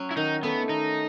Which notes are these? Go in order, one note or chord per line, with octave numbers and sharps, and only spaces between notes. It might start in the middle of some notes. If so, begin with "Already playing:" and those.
Already playing: F#3 C#4
E4
D#3 D#4
A3 B3 E4
D#3 D#4